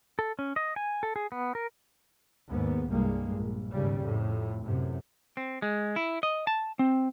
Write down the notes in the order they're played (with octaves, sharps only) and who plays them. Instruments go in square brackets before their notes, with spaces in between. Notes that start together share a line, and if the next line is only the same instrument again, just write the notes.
[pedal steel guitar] A4
C#4
D#5
G#5
A4
G#4
B3
A#4
[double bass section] D#2 G#2 B3
C2 G2 G#3 A#3
A#1
D#2 G#2 C#3 G3
F2 A2
F#2 A2 C3
[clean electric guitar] C4
G#3
E4
D#5
A5
C4